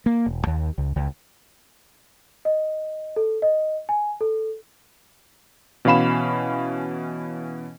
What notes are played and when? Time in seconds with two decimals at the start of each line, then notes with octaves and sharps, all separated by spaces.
0.06 A#3
0.26 E1
0.47 D#2
0.78 C#2
0.96 C#2
2.45 D#5
3.16 A4
3.42 D#5
3.89 G#5
4.21 A4
5.85 B2 E3 C#4 F5 B5 E7